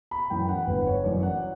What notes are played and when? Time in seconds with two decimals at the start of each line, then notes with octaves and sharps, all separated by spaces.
0.11 B5
0.30 F#2 E3 G5
0.48 F#5
0.67 G1 B4
0.86 C#5
1.04 F#2 E3 D5
1.23 F#5